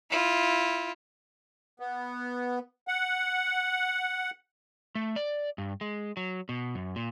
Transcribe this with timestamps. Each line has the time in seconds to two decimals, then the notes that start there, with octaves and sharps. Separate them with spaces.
0.10 E4 F4
1.80 B3
2.88 F#5
4.95 A3
5.16 D5
5.58 G2
5.81 G#3
6.17 F#3
6.49 B2
6.75 F#2
6.96 A#2